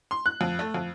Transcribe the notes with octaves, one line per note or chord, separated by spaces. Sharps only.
C6
F#6
F2
A3
F2